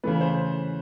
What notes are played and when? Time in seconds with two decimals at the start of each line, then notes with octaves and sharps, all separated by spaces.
0.03 C#3 E3 A3 B4
0.21 C5